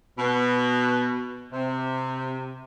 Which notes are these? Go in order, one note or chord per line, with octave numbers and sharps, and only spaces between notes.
B2
C3